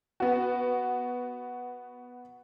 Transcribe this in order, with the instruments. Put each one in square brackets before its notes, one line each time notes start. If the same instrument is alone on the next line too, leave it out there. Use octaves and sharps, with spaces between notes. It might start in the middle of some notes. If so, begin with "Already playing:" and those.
[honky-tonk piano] B3 F#4